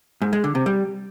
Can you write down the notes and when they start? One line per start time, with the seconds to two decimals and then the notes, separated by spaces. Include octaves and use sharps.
0.22 G#2
0.33 G#3
0.44 D3
0.55 C3
0.66 G3